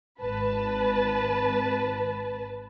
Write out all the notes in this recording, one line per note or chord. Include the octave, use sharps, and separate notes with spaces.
G#1 B4 A5